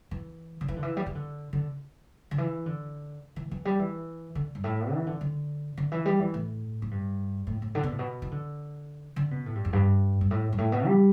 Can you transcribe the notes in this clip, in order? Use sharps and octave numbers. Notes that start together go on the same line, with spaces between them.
E3
D3
E3
D3
E3
G3
E3
D3
D3
D3
E3
D3
E3
E3
G3
E3
D3
G2
A2
E3
D3
D3
D3
E3
G3
E3
A2
A2
G2
A2
A2
D3
B2
A2
B2
E3
D3
D3
B2
A2
G2
E2
G2
G2
A2
G2
A2
B2
G3